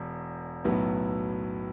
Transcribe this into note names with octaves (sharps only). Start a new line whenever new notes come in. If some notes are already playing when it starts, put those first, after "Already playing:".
Already playing: E1 E2
B1 A2 F#3 B3